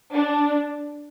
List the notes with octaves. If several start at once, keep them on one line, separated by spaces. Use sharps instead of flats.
D4